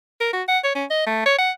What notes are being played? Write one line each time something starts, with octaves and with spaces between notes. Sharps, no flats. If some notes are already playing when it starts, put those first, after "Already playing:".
A#4
F#4
F#5
C#5
C#4
D#5
A3
C#5
F#5